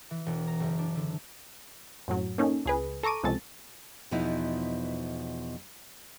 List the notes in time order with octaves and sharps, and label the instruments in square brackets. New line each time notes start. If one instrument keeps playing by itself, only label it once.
[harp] E3
E1
A#5
F#1
D4
D3
[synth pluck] F#2 A2 F#3
A#3 C#4 D#4 A4
C#2 G#4 B4
A4 A#5 C#6 D6 D#7
C#2 C3 F3 G#3 A4 A6
[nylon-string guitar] E2 B2 F3 B3 D#4 E4